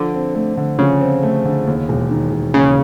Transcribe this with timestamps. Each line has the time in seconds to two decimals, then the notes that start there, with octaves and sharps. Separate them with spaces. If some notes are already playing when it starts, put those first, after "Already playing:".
Already playing: D3 F3
0.14 C4
0.35 A3
0.57 D3
0.79 C#3 F3
1.01 C4
1.23 A3
1.45 D3
1.67 D#2
1.89 E1
2.11 D#3
2.32 E1
2.54 D#2 C#3